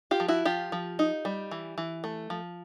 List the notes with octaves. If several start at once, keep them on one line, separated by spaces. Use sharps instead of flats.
F4 G4
F3
E4 F#4
F3 F4 G4
F3
D#4
G3
E3
E3
A3
F3